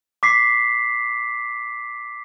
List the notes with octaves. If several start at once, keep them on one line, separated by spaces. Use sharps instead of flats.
D6 B6 C7